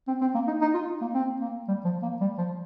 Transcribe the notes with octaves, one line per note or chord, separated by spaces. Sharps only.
C4
C4
A#3
D#4
D#4
F4
A#3
C4
A#3
G3
F3
A#3
G3
F3